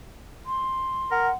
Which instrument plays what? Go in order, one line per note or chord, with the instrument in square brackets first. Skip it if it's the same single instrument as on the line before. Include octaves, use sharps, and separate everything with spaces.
[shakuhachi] C6
[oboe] A#4 [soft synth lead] F#5